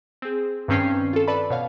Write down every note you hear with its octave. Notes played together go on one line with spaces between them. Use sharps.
C4 G#4
G2 D#3 C4 C#4 G5 C7
F4 A4
A4 B4 D5 A5 B5
B2 C#5 F5